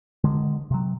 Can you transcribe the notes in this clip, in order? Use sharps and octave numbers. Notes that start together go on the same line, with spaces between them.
D3 D#3 G#3
C3 F#3